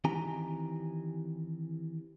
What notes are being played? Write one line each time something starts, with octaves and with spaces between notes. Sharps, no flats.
D#3 E3 C4 G4 G#5 A#5